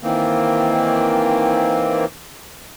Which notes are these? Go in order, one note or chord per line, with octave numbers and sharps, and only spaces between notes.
D#3 E3 A#3 C4